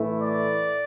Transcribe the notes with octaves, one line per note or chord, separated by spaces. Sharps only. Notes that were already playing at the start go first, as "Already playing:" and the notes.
Already playing: A2 E3 A3 E4
D5